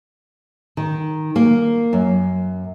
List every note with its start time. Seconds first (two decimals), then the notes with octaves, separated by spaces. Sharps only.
0.77 D#3
1.36 A#3
1.93 F#2